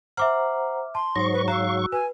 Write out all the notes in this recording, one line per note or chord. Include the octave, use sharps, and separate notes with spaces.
C5 E5 F#5 A#5 D6 F6
A5 C6
G#2 F#3 D#4 C5 C#6 A#6
B4
F#4 F5 A#5 E6
B4 G#5